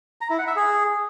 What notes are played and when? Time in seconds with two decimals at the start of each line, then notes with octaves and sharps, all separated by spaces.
0.21 A#5
0.30 E4
0.39 F#5
0.47 E5
0.56 G#4